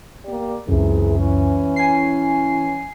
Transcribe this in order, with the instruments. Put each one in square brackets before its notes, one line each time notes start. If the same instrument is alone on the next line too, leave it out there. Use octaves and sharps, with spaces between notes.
[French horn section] A#3 G4 D5
[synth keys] C#2 F#2 [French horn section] C3 E3 G#4
[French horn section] E3 C#4
[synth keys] G#5 C7